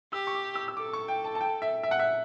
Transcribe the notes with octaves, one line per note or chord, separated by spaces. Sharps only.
G4 E6
C#6
D6
E6
E6
A4 D6
C#6
G5
A5
A5
G5
E5
E5
F#5
E5